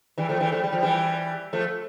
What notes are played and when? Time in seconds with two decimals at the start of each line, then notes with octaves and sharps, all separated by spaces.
0.18 E3 G3
0.29 F3 A3
0.40 E3 G3
0.52 F3 A3
0.63 G3
0.72 F3
0.82 E3 G3
1.53 F3 A3